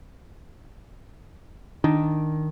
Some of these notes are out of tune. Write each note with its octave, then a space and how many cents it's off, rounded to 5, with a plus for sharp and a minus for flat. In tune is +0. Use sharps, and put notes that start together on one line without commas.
D#3 +0 D4 +0